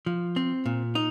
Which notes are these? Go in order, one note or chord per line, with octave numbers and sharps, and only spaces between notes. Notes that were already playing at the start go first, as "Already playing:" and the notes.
F3
C4
A#2
D#4